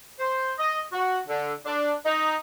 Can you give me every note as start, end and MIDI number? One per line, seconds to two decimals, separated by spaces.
0.19 0.52 72
0.59 0.81 75
0.92 1.19 66
1.28 1.53 50
1.66 1.92 62
2.06 2.35 63